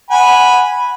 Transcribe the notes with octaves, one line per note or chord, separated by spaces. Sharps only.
F#5 G#5 B5